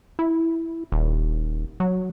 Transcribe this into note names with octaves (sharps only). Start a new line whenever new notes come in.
E4
D#1
F#3